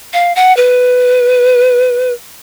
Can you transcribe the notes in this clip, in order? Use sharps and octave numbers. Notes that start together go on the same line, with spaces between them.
F5
F#5
B4